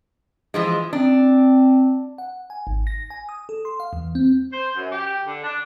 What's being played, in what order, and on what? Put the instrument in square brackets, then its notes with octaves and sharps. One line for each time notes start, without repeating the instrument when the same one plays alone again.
[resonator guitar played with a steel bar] E3 F3 G#3
[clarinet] C4 [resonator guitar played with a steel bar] D4
[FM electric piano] F#5
G#5
G#1
A#6
G#5
D#6
A4
C6
F5
E2
C4
[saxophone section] C5
F#2
G4
D3
D4